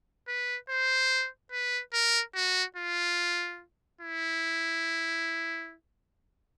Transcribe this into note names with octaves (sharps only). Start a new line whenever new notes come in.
B4
C5
B4
A#4
F#4
F4
E4